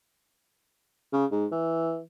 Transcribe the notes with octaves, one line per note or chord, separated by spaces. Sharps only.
C#3
G#2
E3